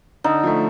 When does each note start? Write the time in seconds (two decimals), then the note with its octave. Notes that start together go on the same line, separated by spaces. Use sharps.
0.24 D3 D#4
0.44 F3 A3